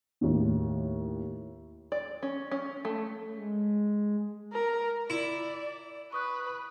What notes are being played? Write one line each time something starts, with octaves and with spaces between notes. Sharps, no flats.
D#2 A2
D5
C#4
C#4
A3
G#3
A#4
E4 D5
B4 C#6 D#6 F#6